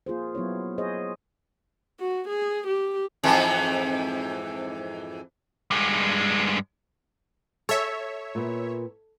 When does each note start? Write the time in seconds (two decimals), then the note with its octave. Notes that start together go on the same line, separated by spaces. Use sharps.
0.06 A#3 F4 G#4 C5
0.35 F#3 B3 E4 C#5
0.78 G#4 C5 C#5 D#5
1.99 F#4
2.28 G#4
2.67 G4
3.23 F2 G#2 E3
5.71 G2 G#3
7.69 A4 C#5 E5
8.35 A#2 B3